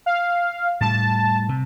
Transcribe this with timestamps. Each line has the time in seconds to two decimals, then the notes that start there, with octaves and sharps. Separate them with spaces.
0.06 F5
0.81 A2 G3 A5
1.49 C3